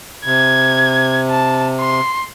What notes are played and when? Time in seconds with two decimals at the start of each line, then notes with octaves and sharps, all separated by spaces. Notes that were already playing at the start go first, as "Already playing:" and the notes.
0.25 C3 G#6
1.30 A5
1.81 C6